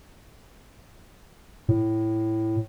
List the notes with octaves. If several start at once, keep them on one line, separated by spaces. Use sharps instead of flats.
A2